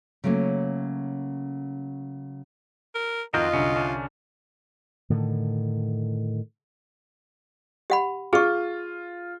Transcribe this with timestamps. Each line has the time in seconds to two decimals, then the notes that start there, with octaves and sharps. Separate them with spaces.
0.24 C#3 F#3 A3 A#3 C#4
2.95 A#4
3.34 F2 D#3 F4 F#4 A#4 D#5 G6
3.53 C2 D3 F#3 C#4
3.76 C#4 D4
5.10 A2 D3 D#3
7.90 G4 F#5 B5
8.33 F4 G#4 C#6